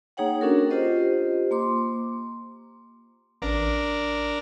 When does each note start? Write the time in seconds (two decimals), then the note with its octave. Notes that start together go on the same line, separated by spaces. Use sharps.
0.17 A#3 D#4 G#4 C#5 F#5 G5
0.41 C#4 D4 F#4 A4 A#4
0.71 F4 G4 C5 D#5
1.51 A#3 C6 D6
3.42 A1 D4 A#4